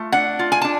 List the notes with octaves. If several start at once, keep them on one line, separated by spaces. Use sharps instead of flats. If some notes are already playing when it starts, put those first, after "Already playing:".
Already playing: A3 F4
D4 F#5
F4
G#5
D4 A5